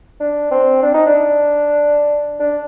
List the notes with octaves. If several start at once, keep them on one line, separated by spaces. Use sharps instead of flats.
D4
C4
D4
D#4
D4
D4